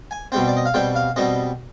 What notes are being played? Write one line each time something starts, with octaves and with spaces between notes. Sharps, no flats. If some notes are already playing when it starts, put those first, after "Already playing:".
G#5
B2 G3 C4 G5
D5
D#5
F5
B2 G3 C4 G5
F5
B2 G3 C4 D#5